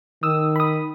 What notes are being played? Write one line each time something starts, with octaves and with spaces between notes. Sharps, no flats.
D#3 D#6 E6
B5 D#6